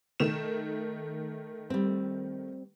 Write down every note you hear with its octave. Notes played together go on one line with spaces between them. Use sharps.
D#3 A3 E7
G3 C4